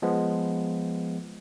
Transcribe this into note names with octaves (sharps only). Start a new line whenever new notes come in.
F3 G#3 B3